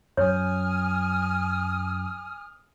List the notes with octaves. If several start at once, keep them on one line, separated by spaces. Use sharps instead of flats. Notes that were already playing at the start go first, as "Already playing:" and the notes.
F#2 F#3 C#5 G#5 D#6 F6